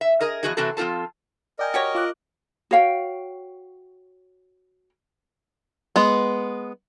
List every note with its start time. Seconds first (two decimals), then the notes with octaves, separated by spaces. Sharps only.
0.01 E5
0.21 G#4 A#4 D#5
0.43 E2 G2 F3 F#4 G#4 D#5
0.57 C3 E3 C4 F#4 A4
0.77 F3 C4 F4 A4 A5
1.59 A#4 D5 D#5 G5 G#5
1.74 F#4 G4 C#5
1.95 F4 D6 F#6
2.71 F#4 C#5 F5 G5
5.96 G#3 B3